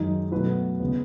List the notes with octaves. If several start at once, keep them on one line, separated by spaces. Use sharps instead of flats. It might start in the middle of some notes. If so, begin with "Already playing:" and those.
Already playing: F#2 D#3 G#3 D#4
B2 F#3 A3 B4
C#3 G#3 B3